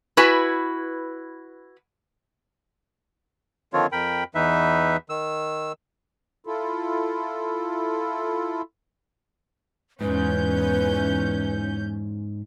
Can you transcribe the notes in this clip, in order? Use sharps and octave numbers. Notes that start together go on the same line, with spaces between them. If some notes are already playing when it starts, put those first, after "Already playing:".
E4 F#4 B4 G#5
D3 D#3 F3 C4 F4 C#5
F2 A#4 G5 B5
E2 E3 D#4 B4 E5
D#3 E6
E4 F4 A4
E2 G#2 C#4 B4 G6